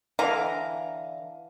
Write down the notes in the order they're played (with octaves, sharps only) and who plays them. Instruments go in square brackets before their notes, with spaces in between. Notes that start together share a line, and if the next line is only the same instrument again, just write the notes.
[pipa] D3 E3 F5 A#5